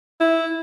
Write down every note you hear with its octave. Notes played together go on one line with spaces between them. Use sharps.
E4